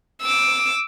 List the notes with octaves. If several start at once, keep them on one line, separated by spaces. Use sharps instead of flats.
D6 E6